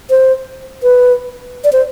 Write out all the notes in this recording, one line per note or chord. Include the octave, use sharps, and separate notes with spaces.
C5
B4
D5
C5